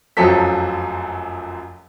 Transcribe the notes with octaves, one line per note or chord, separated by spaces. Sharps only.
F1 F#2 F3 F#3 A4 B6